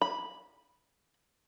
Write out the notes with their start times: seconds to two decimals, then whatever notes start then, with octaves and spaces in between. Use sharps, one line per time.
0.02 B5